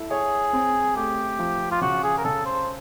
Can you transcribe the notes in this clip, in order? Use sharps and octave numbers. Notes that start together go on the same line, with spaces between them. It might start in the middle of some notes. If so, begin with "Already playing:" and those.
Already playing: E4 A4
G#4 C#5
C4
A3 G4
F3
F4
C#3 F#4
G#4
A#4
C#3 A4
C5